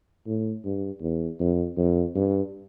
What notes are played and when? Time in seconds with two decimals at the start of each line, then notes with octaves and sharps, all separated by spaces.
0.27 A2
0.64 G2
1.02 E2
1.40 F2
1.77 F2
2.15 G2